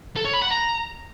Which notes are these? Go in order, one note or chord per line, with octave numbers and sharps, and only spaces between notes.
A4
C#5
B5
F#5
A#5